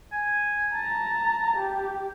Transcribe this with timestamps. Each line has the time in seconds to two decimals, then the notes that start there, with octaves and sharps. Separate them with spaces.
0.12 G#5
0.74 A5 A#5
1.57 G4